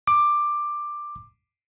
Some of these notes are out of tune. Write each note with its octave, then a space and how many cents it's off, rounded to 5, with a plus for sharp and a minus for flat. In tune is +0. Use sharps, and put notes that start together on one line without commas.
D6 +10